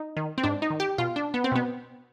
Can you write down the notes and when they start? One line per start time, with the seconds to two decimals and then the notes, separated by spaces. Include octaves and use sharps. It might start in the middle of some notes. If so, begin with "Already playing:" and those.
Already playing: D#4
0.17 D#3
0.38 C4
0.43 G#2 D4
0.62 D#4
0.70 D#3
0.80 G4
0.98 B2 F4
1.16 D4
1.34 B3
1.44 C4
1.52 B2 B3